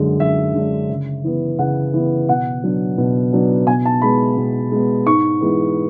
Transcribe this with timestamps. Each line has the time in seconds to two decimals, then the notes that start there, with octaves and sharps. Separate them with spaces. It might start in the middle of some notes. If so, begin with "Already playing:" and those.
Already playing: F#2 D3 G#3 D4
0.19 F#2 E5
0.54 D3 G#3 D4
0.89 C#3
1.24 E3 B3
1.59 C#3 F#5
1.94 E3 B3
2.29 B2 F#5
2.64 F#3 B3 D4
2.98 B2
3.33 F#3 B3 D4
3.67 B2 G#5
3.85 A5
4.02 G#3 B3 B5
4.38 B2
4.72 G#3 B3
5.06 G#2 C#6
5.41 E3 G#3 B3